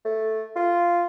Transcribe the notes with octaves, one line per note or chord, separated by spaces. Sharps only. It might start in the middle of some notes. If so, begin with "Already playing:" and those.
A3
F4